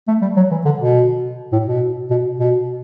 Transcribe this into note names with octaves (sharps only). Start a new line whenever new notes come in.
A3
G3
F#3
E3
D3
B2
A2
B2
B2
B2